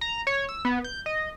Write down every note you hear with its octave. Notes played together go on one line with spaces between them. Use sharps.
A#5
C#5
E6
B3
G6
D#5